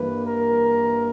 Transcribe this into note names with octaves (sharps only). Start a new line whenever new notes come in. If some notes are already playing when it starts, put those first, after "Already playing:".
Already playing: G2 E3 A#3 B4
A#4